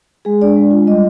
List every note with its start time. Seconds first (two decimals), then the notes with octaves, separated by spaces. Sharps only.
0.25 G#3 G#4
0.42 D4 D5
0.57 G#3
0.71 F4
0.87 G3 D#5